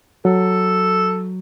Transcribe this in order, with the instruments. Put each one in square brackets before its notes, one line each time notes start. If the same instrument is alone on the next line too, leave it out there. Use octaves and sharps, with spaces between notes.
[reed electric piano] F#3 [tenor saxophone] A4